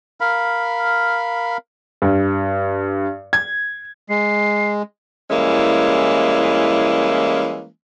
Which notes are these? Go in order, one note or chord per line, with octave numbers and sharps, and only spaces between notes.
A#4 F5 B5
G2
G#6
G#3 C7
E3 G3 G#3 A#3 C#4 E4